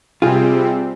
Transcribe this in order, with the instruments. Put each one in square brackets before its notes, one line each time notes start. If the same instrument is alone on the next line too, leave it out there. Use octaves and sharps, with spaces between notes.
[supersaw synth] C3 G3 C4 [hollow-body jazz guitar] F4 G#4